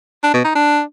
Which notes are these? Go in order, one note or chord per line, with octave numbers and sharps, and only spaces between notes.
D4
B2
D#4
D4